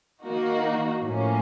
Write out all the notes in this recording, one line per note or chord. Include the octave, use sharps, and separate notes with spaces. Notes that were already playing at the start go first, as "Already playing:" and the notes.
D#3 A#3 D#4 F#4
A2 F3 A#3 C#4